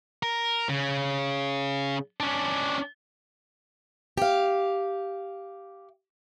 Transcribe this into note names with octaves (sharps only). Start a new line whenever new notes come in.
A#4
C#3
C#4 D4
G4 F5